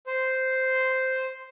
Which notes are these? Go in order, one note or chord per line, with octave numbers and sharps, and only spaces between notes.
C5